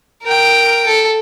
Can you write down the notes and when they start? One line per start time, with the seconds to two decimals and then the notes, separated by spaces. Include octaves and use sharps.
0.23 A#4 G5
0.87 A4